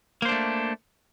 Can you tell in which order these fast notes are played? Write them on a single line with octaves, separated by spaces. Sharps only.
A#3 C5 D4 A3